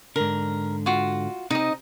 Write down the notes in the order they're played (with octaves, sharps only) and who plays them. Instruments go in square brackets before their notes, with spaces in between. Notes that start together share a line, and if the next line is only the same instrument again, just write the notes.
[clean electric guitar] G#2 D3 [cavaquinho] A#4
[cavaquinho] F4 F#4
[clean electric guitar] C3 C4 [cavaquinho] D#4 D#5